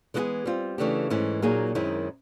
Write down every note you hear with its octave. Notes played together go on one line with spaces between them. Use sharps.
E3 G#3 B3 E4 G#4
G3 C4 F4
C#3 E3 A3 D4 G4
G#2 E3 A3 C#4 E4
A#2 F#3 A#3 D#4 G#4
F#2 D#3 G#3 C4 E4